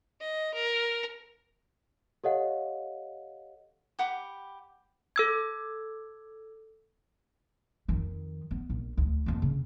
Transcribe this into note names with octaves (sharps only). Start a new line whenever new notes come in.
D#5
A#4
G4 A4 C#5 D#5 F5 F#5
G4 F#5 B5 D6
A4 E6 G#6
F2 D#3
B3
A#1
D2
F2 A#3
C#3